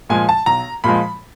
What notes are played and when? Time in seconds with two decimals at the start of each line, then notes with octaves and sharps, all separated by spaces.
0.09 A#2 F3 G#3 G#5
0.29 A5
0.46 B1 A#5
0.84 A#2 F3 G#3 B5